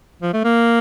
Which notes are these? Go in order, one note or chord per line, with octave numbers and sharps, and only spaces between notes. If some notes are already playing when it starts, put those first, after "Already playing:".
F3
A3
A#3